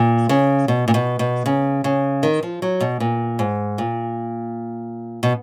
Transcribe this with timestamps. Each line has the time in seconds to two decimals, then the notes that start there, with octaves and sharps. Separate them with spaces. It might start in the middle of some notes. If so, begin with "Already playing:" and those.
Already playing: A#2
0.29 C#3
0.68 B2
0.88 A#2
0.94 B2
1.19 B2
1.46 C#3
1.84 C#3
2.23 D#3
2.43 F3
2.62 F#3
2.80 B2
3.00 A#2
3.39 G#2
3.78 A#2
5.23 B2